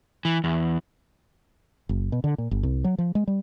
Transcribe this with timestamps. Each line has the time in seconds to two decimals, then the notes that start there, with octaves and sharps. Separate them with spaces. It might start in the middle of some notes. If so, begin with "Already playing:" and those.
0.25 E3
0.44 E2
1.89 F#1
2.12 B2
2.24 D3
2.38 A#2
2.51 G1
2.63 C2
2.84 F#3
2.98 F3
3.15 G#3
3.27 G3